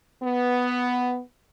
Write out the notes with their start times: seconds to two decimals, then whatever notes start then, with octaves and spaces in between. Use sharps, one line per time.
0.22 B3